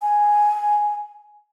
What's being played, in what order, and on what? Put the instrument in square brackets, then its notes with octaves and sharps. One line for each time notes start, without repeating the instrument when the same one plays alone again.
[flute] G#5